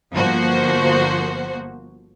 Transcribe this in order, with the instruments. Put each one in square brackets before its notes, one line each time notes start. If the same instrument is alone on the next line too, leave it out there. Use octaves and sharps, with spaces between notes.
[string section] G1 F3 A#3 F#4 C5